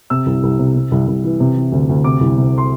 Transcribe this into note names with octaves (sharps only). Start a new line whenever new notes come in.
C3 E6
C2
C2
C3
C3
C2
C2
E3
C3
E3
D2
D2
C3 D6
C2
C3
C6